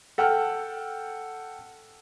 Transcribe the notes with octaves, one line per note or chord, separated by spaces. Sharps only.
A4 F#5 G5 F6